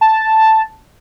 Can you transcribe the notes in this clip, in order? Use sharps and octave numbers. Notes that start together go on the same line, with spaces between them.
A5